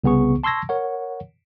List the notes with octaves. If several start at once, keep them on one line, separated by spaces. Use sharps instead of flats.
C2 C#3 B3 G#4 C#6
A5 C6 C#6 E6 G#6 A#6
A#4 C#5 F#5